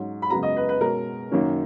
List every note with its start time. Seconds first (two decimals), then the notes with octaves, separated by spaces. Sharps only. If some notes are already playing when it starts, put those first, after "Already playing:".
Already playing: G#2 F#3 C#4
0.22 B5
0.30 F#2 C#3 G#3 B3 A#5
0.43 D#5
0.57 B4
0.69 B4
0.81 B2 G#3 C#4 A#4
1.32 F#2 D#3 A#3 C#4